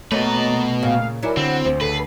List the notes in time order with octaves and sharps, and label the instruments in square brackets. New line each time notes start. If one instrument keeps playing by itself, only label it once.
[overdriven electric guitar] B2 B4 [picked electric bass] A3 [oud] A#3 C#5 [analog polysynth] D#5 A#5 A6
[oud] A#2 C#3 [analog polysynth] F5
[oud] F#3 E4 [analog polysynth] A#4 D5 G#5
[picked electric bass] D3 [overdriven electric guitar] C4 [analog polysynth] F#5
[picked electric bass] D2 [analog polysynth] C5
[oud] C#3 [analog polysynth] A4 C7 [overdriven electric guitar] B4